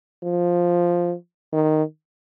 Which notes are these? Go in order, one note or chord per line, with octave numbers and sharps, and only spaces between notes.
F3
D#3